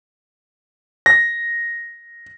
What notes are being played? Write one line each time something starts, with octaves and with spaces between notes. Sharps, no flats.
A#6